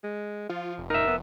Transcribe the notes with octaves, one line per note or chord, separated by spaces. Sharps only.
G#3
F3 F4
F1
D#4 A#4 E5
B3